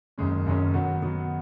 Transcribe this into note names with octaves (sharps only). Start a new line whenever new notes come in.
F#1 F#2 D#3 G#3 C#4
F#1 F#2 D#3 G#3 C#4
D#3 F#3 B3 F#4
D#3 F#3 B3 F#4